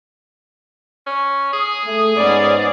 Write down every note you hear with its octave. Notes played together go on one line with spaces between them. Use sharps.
C#4
G#4 D#6
A3
G#2 B3 C#4 D5